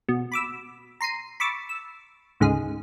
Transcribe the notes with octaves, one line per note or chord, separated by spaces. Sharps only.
B2
B5 D6 E6
A#5 C6 C7 D#7
B5 C#6 D6 E6 A6
E6
D2 G#2 C#3 G#4